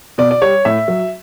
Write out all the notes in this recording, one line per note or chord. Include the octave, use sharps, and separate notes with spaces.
B2 D5
D5
G3 C#5
A2 E5
F#3